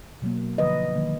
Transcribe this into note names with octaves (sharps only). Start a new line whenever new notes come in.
B2 F#3 A#3
D3 F3 A#3 B4 D#5
D#3 F#3 A#3